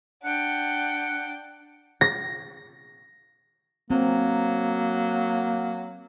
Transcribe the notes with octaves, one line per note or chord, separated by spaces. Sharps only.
D4 F#5 G5
A#6
F#3 A#3 C4